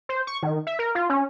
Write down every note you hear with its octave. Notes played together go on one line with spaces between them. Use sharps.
C5
C#6
D#3
E5
A#4
F4
C#4